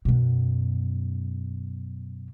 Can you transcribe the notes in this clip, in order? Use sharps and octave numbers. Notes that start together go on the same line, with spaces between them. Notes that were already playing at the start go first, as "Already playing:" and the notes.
F#2 B2